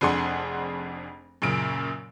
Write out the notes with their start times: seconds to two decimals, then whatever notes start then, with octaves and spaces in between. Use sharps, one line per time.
0.01 F1 F2 D4 G#4 F#5 C6
1.42 F#2 A#2 C#3 D7